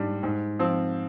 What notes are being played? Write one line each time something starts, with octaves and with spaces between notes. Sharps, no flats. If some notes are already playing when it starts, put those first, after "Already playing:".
Already playing: G#2 G3 D4
G#2
F3 C4